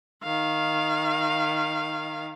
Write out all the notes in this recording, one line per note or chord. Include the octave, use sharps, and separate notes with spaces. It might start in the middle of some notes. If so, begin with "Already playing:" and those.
D#3 F5